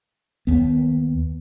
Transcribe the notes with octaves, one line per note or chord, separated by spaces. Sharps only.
D#2 B3